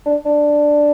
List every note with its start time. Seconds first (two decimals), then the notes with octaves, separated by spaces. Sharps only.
0.06 D4
0.25 D4